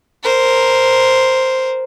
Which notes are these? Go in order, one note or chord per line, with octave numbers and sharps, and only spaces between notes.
A#4 C5